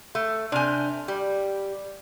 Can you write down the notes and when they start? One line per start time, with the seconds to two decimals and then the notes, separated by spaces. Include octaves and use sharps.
0.15 A3
0.52 C3 D4 G#5 F6 G6
1.08 G3 G4